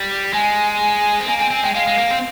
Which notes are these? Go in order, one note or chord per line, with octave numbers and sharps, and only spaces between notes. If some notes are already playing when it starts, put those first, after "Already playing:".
Already playing: G3
G#3 G#5
C4
A#3 G#5
C4 G#5
C4 G#5
G#3 G5
G#3 F5
G#3
A#3
C4